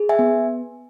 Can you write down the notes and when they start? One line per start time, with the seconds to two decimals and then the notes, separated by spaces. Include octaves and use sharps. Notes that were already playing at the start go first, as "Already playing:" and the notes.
Already playing: G#4
0.09 E5 G#5
0.19 B3